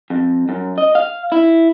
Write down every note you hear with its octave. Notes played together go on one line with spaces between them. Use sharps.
F2
F#2
D#5
F5
E4